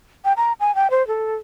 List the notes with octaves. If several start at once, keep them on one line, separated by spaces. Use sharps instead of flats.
G5
A#5
G#5
G5
C5
A4